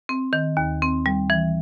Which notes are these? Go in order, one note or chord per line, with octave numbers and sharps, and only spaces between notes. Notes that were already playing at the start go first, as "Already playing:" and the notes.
C4
D#3
D#2
C4
G3
E3